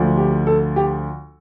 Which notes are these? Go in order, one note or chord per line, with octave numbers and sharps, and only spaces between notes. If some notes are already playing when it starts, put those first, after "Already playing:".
Already playing: D2 D3 F3
G4
A4
G4